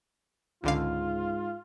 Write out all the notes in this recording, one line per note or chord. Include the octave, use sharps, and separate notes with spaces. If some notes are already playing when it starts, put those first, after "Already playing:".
C#2 G#2 D3 F4 F5